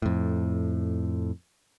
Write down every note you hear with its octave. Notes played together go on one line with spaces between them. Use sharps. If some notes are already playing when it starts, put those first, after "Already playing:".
F2 A2